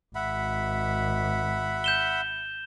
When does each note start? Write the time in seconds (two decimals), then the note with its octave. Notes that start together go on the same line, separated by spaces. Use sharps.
0.15 G#1 E5 F#5 B5
1.84 G6 E7 G7